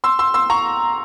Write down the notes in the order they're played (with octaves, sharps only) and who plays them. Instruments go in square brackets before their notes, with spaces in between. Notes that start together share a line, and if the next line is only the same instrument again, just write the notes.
[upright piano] C6 E6
C6 E6
C6 E6
A#5 C#6